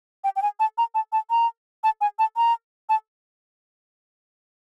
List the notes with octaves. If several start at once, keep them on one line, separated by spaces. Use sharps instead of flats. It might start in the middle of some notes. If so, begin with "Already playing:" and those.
G5
G5
G#5
A5
A#5
A5
A5
A#5
A5
G#5
A5
A#5
A5